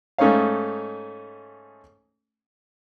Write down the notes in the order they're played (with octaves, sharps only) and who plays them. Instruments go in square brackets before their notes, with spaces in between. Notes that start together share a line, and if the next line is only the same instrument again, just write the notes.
[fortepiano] G#2 A3 C#4 D#4 C#5 F5